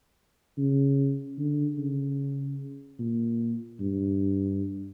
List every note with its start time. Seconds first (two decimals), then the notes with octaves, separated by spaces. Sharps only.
0.58 C#3
1.38 D3
1.78 C#3
2.99 A#2
3.80 G2